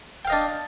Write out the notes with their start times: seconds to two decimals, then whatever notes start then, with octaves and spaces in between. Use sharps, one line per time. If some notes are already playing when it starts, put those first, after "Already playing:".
0.25 G5
0.27 F5
0.30 D#5
0.32 D4